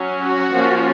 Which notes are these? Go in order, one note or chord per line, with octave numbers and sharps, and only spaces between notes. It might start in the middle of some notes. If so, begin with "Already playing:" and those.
Already playing: F#3 C#4
F#4
F3 A#3 C#4